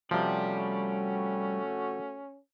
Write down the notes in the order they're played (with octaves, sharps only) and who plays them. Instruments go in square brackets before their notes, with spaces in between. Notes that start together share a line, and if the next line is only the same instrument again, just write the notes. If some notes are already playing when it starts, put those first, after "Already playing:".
[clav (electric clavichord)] C3 F3 [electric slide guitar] G3 D5 [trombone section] A3 F#4 [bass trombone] C#4